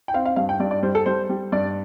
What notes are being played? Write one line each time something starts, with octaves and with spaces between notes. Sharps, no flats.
G5
C4 F5
F5
G2 F5
G5
G2 D5
D5
G3 C5
A4
G3 C5
G3
G2 D5